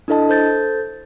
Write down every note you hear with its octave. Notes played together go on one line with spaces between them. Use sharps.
D4 E4 A4 D#5 A5
A4 C5 G6 A6